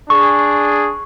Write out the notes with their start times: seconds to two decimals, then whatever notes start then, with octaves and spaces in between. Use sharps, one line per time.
0.10 D4 G#4 C#6